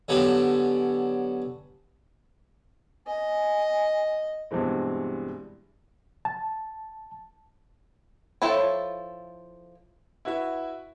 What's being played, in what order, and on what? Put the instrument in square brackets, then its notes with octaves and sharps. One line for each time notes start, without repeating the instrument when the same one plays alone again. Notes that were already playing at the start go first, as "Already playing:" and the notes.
[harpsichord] D3 F#3 B3 C#4 G4 A4
[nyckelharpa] D#5 [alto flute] G#5
[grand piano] G2 B2 E3 G#3 C4
[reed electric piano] A5
[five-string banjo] F3 E4 A4 C#5
[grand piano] E4 F#4 B4 E5